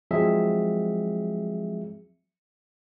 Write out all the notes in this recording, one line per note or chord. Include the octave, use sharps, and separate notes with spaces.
F3 F#3 G#3 C4 G#4 E5